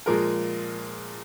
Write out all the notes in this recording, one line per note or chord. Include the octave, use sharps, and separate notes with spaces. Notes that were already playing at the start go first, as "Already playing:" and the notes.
A#2 F3 G#3 A#4